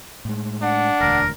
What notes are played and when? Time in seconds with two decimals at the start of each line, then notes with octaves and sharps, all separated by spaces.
0.25 A2 G#3
0.62 D4 F#5
1.01 E1 D2 A#4